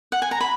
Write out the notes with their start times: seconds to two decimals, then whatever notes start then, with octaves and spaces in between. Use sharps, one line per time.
0.12 F#5
0.22 G#5
0.31 A#5
0.41 B5